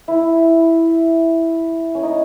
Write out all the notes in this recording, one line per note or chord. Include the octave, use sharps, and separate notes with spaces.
E4
C#4
D#4